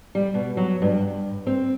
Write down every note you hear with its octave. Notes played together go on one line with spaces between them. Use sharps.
G3
B2
F#3
G2
C4